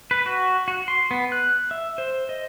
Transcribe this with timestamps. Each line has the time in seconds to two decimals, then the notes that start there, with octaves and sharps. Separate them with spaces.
0.11 B4
0.26 F#4
0.68 F#4
0.88 C6
1.11 B3
1.32 F#6
1.71 E5
1.98 C5
2.29 D#5